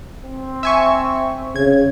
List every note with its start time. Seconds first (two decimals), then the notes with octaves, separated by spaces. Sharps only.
0.24 C4
0.63 E5 G#5 C#6
1.56 C#3 G#6